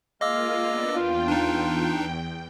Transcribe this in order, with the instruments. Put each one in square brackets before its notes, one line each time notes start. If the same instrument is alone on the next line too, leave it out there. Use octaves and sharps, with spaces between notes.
[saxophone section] G#3 F5 [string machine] A#3 F4 [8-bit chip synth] D#5 D6 E6
[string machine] B3 D4
[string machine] E2 G5 [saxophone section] F4
[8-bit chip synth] D4 D#4